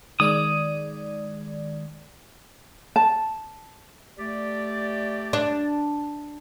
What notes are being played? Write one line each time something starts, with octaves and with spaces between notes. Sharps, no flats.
D#3 G#3 D5 D#6
A5
A3 G4 D5
D4